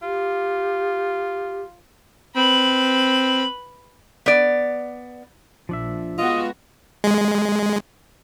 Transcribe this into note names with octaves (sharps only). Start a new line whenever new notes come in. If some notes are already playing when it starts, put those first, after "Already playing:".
F4 G4
C4 B4 B5
B3 D5
A#1 F3 D4 E5
G#3 B3 F4 F#4 D#5
G#3